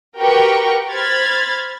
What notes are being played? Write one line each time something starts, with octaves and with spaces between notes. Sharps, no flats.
F#4 G4 A#4 B4 G5 C#6
C5 B5 F6 G#6 A6